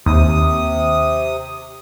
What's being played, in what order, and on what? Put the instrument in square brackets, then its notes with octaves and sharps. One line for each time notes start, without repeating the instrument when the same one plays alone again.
[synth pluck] D#2 [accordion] C3 D#6